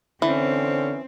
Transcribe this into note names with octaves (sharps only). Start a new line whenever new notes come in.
D3 E3 C4 C#4